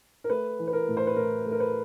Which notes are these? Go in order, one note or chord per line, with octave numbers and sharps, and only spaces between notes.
A#4
A3 B4
E3
B4
A#4
A2
C5
B4
A2 A#4
A3
A#4
B4